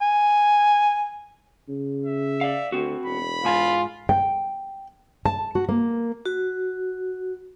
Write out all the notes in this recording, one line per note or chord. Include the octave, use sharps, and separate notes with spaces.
G#5
C#3
E5
D5 F5
D2 C4 F#4
E1 B5
G#2 F4 G#5
G5
A5
F#4
A#3
F#4